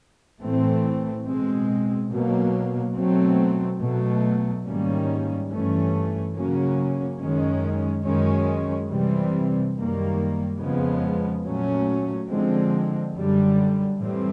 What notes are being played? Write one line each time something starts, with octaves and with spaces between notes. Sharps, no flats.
A2 E3 A3 C4
B2 G#3 C4
B2 F#3 A#3
B2 F#3 A3 C4
B2 F#3 A3
G#2 D#3 G3 A#3 C#4
G2 E3 A3 C#4
C#3 F#3 A#3 C#4
F#2 D#3 G#3 C#4
F#2 D#3 G#3 C#4
C3 E3 G3 C4
F#2 D#3 G3 A#3
F2 C#3 F3 G#3 B3
A#2 F#3 A3 C#4
D3 F3 G#3 C4
F#2 D3 G3
A2 E3 G3 C4